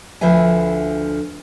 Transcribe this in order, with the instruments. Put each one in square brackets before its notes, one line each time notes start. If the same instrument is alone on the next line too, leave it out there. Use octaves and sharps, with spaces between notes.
[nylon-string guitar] D2 D3 F3 B4 E5 G#5